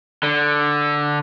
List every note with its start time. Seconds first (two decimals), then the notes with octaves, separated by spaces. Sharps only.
0.23 D3